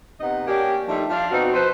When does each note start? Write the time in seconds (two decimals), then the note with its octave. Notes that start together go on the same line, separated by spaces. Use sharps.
0.20 C3 B3 D#4 D#5 F#5
0.47 A#3 C#4 D4 G4
0.88 F3 G3 A3 D4 D#4
1.10 F3 D4 D5 F5
1.31 B2 C4 D#4 F#4
1.53 F3 B4 C5